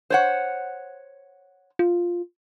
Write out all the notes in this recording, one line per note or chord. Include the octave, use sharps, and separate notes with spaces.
C5 C#5 F#5
F4